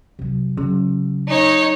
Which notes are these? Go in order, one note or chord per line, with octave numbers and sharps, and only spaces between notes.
C3 F#3
C#3 F#3
D#4 C#5